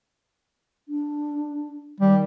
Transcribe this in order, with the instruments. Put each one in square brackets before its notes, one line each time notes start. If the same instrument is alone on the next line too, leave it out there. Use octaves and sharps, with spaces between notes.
[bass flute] D4
[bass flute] D#3 [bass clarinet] G3